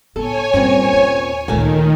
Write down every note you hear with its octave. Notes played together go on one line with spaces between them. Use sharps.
A2 B3 A4 C#5 G#5
G2 A#2 C4 C#4
D#2
D2 A#2 D#3 A3 A#3 G#5